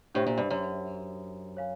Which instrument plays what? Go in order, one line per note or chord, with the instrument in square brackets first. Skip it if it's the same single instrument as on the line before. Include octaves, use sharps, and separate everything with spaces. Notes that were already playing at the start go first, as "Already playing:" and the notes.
[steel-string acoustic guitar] A2 [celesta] D4 G4 C5 E5
[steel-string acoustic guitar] A#2
G2
F#2
[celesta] C#5 F5 G#5